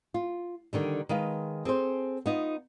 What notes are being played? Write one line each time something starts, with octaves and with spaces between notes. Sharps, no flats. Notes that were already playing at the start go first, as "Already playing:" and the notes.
F4
D3 D#3 G3
D#3 G#3 B4 F5
C4 G#4 A4 C5
B3 D#4 F4